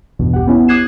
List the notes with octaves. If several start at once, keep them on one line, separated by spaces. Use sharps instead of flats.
A1 E2 G2 B2
G4 F#5
B3 C#4 E4
D6 D#6 F#6 G#6 C7 E7